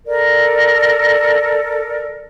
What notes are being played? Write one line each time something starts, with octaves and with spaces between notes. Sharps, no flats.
A4 A#4 D5